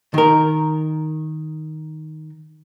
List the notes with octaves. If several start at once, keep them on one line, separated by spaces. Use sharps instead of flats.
D#3 A#4